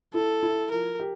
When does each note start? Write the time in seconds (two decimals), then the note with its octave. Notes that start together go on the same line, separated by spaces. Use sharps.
0.14 E4 A4
0.43 E4
0.71 F3 A#4
1.00 G4